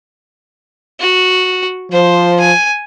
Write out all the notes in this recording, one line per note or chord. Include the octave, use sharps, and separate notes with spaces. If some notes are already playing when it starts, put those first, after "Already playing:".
F#4
F3 C5
G#5